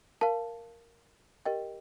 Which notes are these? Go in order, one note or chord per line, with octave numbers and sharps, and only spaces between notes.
A#4 F5 A5
G4 A#4 D#5 G5